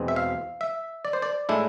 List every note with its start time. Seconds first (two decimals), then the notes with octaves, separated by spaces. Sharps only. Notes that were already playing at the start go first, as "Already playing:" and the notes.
Already playing: E2 B2 G#3 C4
0.08 E5
0.16 F5
0.61 E5
1.05 D5
1.13 C5
1.22 D5
1.49 A2 G#3 D4 E4